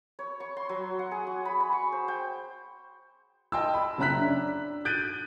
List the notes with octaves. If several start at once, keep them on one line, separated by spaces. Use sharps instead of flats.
C#5
C#6
C6
F#3
F#5
G#4
F#4
B5
B5
C#6
C5
G5
D#5 G5 A5 C6 E6
B5
F#1 C#4 E5 A#5 F#6 B6
D4
F#6 G6 A6 D7 D#7